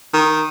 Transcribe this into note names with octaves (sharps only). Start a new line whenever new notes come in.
D#3